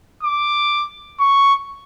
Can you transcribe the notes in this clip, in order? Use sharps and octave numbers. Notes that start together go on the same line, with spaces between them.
D6
C#6